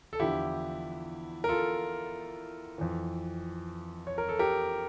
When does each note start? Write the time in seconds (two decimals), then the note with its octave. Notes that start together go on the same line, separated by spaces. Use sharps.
0.13 A4
0.20 E2 D3 F3 E4 G4
1.44 A#4
1.49 F4 A4
2.78 F2 E3
4.07 C#5
4.18 A#4
4.29 A4
4.39 G4 A#4